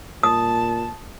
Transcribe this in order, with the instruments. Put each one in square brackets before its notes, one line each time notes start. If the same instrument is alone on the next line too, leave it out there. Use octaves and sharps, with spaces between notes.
[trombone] A#2 [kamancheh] A5 [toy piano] D#6